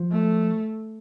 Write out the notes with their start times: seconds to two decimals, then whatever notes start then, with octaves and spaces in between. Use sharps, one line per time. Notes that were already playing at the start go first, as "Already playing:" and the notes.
Already playing: F3
0.11 A3